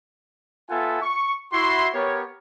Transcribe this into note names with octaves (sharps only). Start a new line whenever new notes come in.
B3 F4 A4 E5 F#5 G#5
C#6
E4 F#4 C6
B3 G4 A#4 C#5